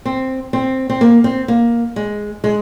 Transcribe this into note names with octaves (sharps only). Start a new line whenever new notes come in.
C4
C4
C4
A#3
C4
A#3
G#3
G#3